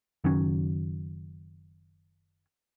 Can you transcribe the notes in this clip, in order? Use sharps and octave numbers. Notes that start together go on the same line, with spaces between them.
F#1 D#3 F#3 C#4